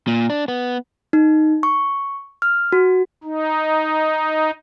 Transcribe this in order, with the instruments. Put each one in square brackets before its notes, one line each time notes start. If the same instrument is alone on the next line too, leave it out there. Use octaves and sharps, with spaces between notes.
[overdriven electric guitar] A#2
D4
B3
[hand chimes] D#4
C#6
F6
F#4
[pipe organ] D#4